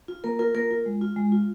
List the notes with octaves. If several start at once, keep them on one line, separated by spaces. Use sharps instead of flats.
F4
A#3 A#4
F4 A#4
A#3 A#4
F4
G#3
F4
G#3
F4